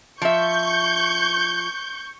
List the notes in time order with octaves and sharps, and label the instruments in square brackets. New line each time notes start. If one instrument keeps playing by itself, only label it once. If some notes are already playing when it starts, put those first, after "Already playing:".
[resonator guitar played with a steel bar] F3 E5 [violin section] C#6 G6